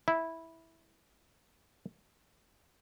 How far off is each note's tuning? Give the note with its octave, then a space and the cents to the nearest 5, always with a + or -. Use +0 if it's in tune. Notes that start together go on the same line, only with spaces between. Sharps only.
E4 -10